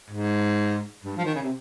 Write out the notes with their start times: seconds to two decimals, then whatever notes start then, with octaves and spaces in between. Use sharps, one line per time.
0.11 G#2
1.03 G2
1.17 F3
1.25 D#3
1.34 C#3
1.42 C3